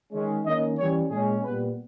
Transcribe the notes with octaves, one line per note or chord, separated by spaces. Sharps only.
D#3 G#3 C#4
D#3 A#3 C#4 D#5
E3 G3 C#4 C#5
A#2 G#3 C#4 G#4
A#2 G3 B3 B4